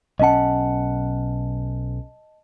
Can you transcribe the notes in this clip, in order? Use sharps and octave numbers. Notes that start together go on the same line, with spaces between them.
B1 C#4 D#5 F#5 A5